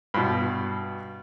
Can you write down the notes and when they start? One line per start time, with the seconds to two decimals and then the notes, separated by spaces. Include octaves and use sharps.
0.14 G2 B2